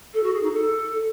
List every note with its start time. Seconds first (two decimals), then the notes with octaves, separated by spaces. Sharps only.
0.13 A4
0.23 F#4
0.33 G#4
0.42 D#4
0.52 A4